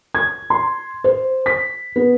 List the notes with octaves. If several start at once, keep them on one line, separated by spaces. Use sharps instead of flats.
G#6
C6
C5
B6
B3